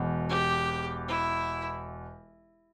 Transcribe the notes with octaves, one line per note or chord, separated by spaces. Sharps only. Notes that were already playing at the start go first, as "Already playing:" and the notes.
Already playing: E1 E2 B2
G4
E4